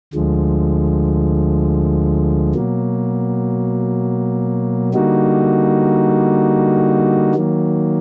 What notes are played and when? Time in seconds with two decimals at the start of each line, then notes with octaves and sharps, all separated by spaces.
0.13 D2 D3 F3 G#3
2.54 B2 F#3 A#3
4.94 D3 G3 A#3 D#4 F#4
7.35 D#3 F#3 A#3